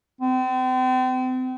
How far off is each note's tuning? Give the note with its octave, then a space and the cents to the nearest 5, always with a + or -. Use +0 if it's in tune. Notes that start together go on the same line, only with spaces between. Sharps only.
C4 -35